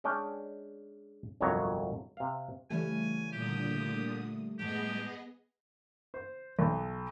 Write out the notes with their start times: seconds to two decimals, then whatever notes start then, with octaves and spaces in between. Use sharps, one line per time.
0.04 G#3 C#4 D4 G5
1.41 G1 C2 F2 F#3 C#5
2.17 C3 F5
2.70 C#3 E3 G3 A3 C#4 G#5
3.33 A#2 D3 G4 D#6
4.59 A2 G#3 B3 G4 G#4 D#5
6.14 C5
6.59 B1